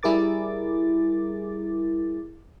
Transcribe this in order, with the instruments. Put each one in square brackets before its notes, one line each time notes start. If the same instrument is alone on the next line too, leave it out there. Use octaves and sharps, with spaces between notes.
[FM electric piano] G3 E4 G#4 A#4 D6 A6